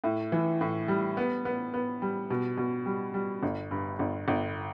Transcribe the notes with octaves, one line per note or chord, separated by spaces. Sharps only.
A2
E3
A2
G3
B3
B3
B3
G3
B2
B2
G3
G3
G1
G2
G1
G1